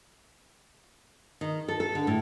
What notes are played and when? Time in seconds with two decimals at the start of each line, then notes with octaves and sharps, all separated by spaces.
1.41 D#3
1.68 A4
1.80 A4
1.95 D3
2.07 A2